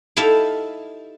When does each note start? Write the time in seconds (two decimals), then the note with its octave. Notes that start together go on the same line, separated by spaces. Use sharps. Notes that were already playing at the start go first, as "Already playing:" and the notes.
0.16 D#4 E4 G4 A4 E5 F5